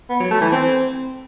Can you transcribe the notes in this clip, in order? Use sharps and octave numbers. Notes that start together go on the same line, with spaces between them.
B3
F#3
A3
E3
C4